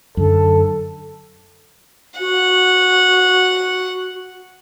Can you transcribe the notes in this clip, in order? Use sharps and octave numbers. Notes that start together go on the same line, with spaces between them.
F#2 D3 A4
F#4 F#5